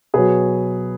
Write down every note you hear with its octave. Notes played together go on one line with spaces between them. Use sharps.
B2 F#3 G#4 B4